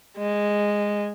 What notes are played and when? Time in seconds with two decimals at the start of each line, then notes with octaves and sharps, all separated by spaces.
0.17 G#3